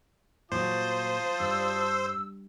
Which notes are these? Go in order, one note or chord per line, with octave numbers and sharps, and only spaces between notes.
A#2 F#3 F4 C5 A5 D#6
G2 E6